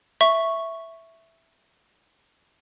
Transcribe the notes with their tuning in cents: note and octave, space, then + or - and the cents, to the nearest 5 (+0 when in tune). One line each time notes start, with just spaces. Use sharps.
E5 +0 C#6 +0